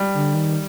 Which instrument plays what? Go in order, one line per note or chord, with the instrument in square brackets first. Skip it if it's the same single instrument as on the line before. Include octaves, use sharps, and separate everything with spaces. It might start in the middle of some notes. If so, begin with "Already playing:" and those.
Already playing: [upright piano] G3
[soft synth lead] D3
D#3